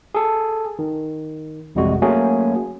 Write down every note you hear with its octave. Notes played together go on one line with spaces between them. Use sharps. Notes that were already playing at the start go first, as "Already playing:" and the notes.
G#4 A4
D#3
A1 F2 C3 G3 G#3 F#4
F#3 A3 A#3 C#4 F#4 G#4